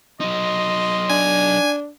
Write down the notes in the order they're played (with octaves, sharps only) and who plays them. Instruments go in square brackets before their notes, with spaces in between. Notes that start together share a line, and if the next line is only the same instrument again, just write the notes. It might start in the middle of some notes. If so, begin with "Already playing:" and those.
[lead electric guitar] F#3 D#4 [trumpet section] D#5 C6
[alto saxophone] D4 [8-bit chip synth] G#5